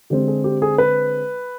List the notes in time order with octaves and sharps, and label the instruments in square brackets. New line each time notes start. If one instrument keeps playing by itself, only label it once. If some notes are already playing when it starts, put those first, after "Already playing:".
[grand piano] D3 G#3 C4 G4
G#4
G4
G#4
B4